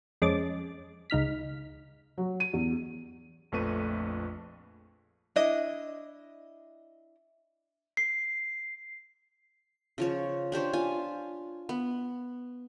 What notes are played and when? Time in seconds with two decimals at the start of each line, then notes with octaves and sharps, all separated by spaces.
0.22 F2 G#3 C#4 D6 A6
1.10 C#2 D#4 F6 B6
2.18 F#3
2.40 D#7
2.53 E2
3.52 A#1 F2 A3 B4 C#6 D#7
5.36 D4 E4 D#5
7.97 C7
9.98 C#3 F3 C#5
10.52 D4 G4 C5 C#5
10.73 F4 F5 G#5
11.69 B3